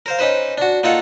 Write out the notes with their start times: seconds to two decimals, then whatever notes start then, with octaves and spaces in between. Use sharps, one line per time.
0.06 A#4 C5 F5
0.19 C#4 D#4 B4 C5
0.58 D4 F#4
0.83 A#3 D#4 F4 A4 F5 F#5